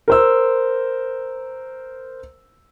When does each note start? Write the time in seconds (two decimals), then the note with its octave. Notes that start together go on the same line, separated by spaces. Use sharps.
0.08 A#4 C5 E6